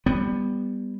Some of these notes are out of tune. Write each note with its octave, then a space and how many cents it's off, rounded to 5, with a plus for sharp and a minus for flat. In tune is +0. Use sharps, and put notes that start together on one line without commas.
G3 +15 B3 +0